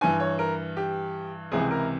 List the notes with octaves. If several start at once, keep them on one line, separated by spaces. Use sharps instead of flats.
G2 E3 G#5
C#5
A#4
G4
C#2 C3 E3 G#4
A#4